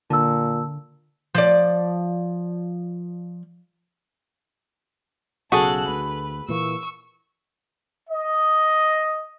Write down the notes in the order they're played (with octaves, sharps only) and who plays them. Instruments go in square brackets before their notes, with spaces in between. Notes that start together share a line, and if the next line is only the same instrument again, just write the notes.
[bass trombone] A#2 [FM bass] D3 [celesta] A5 E6
[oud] F3 D5
[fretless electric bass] B1 C#3 [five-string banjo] F#4 G#4 A4 [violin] A5 F#6
[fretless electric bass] D2 [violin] B4
[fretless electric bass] A#2 E3 A#3 [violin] C#6 E6
[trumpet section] D#5